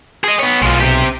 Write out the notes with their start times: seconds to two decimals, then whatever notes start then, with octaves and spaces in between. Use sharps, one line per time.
0.24 G#4 D#5
0.39 B3 C#5
0.62 B1 G#3 F4
0.80 C3 G4